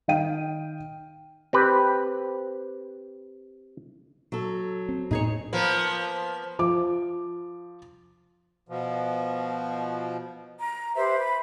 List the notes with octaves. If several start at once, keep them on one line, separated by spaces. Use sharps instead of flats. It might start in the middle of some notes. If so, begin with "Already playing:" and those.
D#3 D#5 F5 G5 D#7
C4 G4 B4
F#3 A4
C4
A2 D#4 G#4 C#5
F3 A#3 B3
F3 D6
B2 F3
A#5
G4 B4 C5 E5
B5